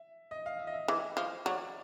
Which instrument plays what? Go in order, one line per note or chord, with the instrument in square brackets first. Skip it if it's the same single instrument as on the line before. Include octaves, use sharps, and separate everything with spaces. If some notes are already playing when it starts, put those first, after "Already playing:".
Already playing: [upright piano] E5
D#5
F5
E5
D#5
E5
[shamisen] E3 [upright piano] D#5
[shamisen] F3
[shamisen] F#3 [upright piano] D5